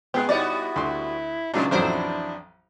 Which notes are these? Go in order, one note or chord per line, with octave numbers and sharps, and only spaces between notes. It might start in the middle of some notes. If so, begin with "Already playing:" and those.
G#3 B3 G#4 G5 F#6
G3 B3 D#4 E4 F#4 C#5 D5
D2 C6
A#2 C#3 F#3 G#3 D4 D#4
A1 F2 F#3 D4 E4 C5